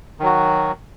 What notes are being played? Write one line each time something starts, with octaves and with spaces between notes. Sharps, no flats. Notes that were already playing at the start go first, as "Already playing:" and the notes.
D#3 F#3 F#4